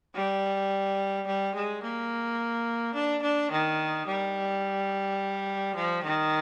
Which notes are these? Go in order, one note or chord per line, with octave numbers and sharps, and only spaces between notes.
G3
G3
G#3
A#3
D4
D4
D#3
G3
F3
D#3